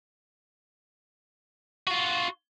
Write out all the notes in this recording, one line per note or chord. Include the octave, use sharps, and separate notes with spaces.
F4 F#4